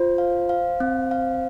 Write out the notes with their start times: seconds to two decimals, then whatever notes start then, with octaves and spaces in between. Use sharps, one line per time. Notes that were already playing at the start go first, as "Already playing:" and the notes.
Already playing: F4 C5
0.18 F5
0.49 F5
0.80 C4
1.11 F5